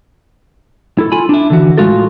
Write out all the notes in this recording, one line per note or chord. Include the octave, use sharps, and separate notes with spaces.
E4 A4
F4 G#5 B5
D4 E4
D3 E3 F#4
A2 G#3 F4 F#4 A4